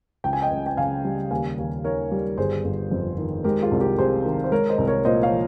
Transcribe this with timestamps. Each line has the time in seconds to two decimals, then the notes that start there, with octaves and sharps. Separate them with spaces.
0.24 C#2 G5
0.33 G#5
0.42 D#5 G5
0.51 C#2
0.66 G5
0.77 C#3 F5 G#5
1.05 G3
1.31 D#2 F5 G#5
1.58 D#2
1.84 D#3 A#4 C#5
2.12 G3
2.38 G1 G#4 C5
2.65 G1
2.91 F2
3.18 D#3
3.44 G#3 G4 A#4
3.62 F4 G#4
3.71 C2
3.80 G4 A#4
3.98 C3 G#4 C5
4.25 D#3
4.44 C5
4.51 G#3 A#4 C#5
4.69 C5 D#5
4.78 C2
4.87 A#4 C#5
5.05 A#2 C5 D#5
5.23 C#5 F5
5.31 F3